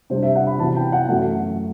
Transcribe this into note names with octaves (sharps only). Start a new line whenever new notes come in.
C3 G3 D4 C5
E5
F#5
B5
E2 C3 F#3 A5
G5
F#5
F#2 F#3 A3 F#5